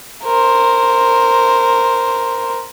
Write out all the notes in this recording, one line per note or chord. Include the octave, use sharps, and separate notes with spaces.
A#4 C5